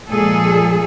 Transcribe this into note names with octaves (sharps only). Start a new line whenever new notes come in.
A#2 F3 G#3 A#3 G#4 A4